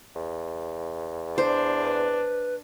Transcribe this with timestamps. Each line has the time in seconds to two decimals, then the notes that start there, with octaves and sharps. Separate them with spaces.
0.16 E2
1.38 D4 C5
1.84 B4